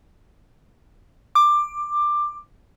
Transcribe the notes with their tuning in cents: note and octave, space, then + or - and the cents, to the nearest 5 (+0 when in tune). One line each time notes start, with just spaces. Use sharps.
D6 +15